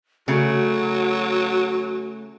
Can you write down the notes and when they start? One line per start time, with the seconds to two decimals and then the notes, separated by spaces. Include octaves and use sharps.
0.28 C#3 F#3 A3 F#4